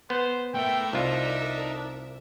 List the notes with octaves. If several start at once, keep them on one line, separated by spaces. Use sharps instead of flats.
B3 C5
A3 E4 A#4 E5 G5
C2 D4 D#4 F4